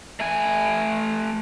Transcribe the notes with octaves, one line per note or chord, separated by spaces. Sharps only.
A3 G#5